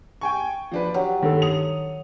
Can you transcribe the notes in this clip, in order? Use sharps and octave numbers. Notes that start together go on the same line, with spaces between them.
G5 G#5 C#6
F3 D4 B4
F#3 G4
G2 D#3 A4
D#6 C#7 F7